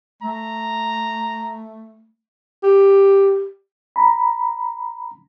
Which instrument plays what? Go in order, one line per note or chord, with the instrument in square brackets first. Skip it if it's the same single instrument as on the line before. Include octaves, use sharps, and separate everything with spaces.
[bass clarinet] A3 [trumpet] A#5
[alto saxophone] G4
[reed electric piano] A#5 B5